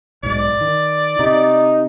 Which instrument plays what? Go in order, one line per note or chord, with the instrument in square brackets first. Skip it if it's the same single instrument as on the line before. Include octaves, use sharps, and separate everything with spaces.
[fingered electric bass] B1 G#2 [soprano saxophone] D5
[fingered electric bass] D#3
[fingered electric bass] C3 [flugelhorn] D#4